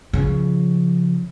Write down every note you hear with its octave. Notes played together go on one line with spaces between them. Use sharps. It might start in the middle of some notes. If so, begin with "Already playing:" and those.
C#3 F3